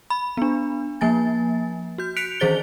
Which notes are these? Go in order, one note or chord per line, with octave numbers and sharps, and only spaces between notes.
B5
B3 D4
F3 A#3 G#5 A6
F#4 G6
F#6 B6 C#7 D7 F7
D#3 E3 G#4 C5 A6 G7